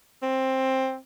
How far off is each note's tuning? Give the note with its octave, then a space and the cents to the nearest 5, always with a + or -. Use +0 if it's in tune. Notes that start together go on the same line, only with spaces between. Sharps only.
C4 +10